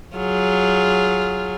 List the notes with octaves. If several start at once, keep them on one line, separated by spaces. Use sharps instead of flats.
F#3 F4 G#4